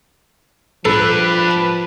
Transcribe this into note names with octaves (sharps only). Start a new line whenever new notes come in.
F3 D4 G4 A4 B4